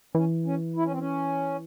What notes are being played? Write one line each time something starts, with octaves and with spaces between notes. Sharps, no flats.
E3 C#4
C#4
E4
C#4
C4
C#4